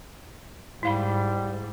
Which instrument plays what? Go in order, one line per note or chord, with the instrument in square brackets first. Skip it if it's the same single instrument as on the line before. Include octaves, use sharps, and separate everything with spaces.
[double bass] G#2 [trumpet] G3 [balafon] E4 F5 B5